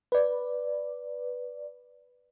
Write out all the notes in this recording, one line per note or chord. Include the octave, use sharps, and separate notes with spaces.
B4 D5